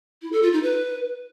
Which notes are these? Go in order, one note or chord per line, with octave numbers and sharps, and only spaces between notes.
E4
A4
F4
D#4
B4